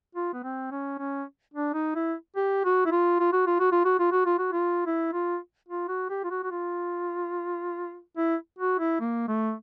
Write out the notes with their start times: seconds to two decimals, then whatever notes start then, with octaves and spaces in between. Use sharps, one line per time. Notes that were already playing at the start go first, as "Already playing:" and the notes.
0.15 F4
0.33 B3
0.43 C4
0.71 C#4
0.98 C#4
1.54 D4
1.74 D#4
1.95 E4
2.36 G4
2.65 F#4
2.85 E4
2.91 F4
3.20 F4
3.33 F#4
3.46 F4
3.60 F#4
3.72 F4
3.85 F#4
3.99 F4
4.12 F#4
4.26 F4
4.39 F#4
4.52 F4
4.86 E4
5.13 F4
5.68 F4
5.88 F#4
6.10 G4
6.24 F4
6.31 F#4
6.43 F#4
6.51 F4
8.17 E4
8.58 F#4
8.79 E4
9.00 A#3
9.28 A3